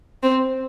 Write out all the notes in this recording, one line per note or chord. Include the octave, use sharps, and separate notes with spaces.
C4